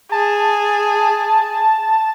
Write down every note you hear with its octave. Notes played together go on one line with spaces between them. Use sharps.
G#4 A5